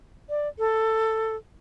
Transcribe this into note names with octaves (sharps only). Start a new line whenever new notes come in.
D5
A4